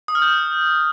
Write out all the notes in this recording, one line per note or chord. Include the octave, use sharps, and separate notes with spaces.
D#6
F6
G6